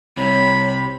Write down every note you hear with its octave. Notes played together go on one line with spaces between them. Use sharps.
C2 C3 C#5 B5